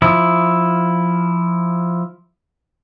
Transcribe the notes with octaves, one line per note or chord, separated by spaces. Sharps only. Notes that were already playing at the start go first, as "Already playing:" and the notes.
F3 E4